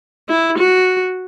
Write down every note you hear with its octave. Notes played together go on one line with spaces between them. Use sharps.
E4
F#4